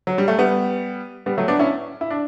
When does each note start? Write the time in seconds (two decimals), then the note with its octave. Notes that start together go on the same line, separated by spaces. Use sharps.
0.07 F#3
0.18 G3
0.28 A3
0.38 G3 B3
1.26 G3 B3
1.38 F#3 A3
1.48 B3 D4
1.59 C#4 E4
2.01 E4
2.10 D4